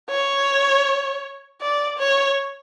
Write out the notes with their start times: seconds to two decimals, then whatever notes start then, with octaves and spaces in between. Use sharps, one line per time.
0.10 C#5
1.61 D5
1.99 C#5